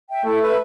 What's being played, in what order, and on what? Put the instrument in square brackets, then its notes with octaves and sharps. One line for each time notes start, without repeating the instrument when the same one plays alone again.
[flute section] E5 G5
[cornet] A3 [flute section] E4
[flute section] B4 E5 B5